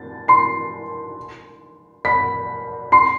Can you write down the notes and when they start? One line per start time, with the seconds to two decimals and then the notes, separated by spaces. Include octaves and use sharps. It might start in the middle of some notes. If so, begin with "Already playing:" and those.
Already playing: A6
0.28 C6 C7
2.05 B5 B6
2.92 C6 C7